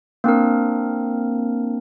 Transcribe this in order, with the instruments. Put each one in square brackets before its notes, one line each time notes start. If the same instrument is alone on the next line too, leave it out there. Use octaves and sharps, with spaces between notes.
[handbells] A#3 C4 D4 A#4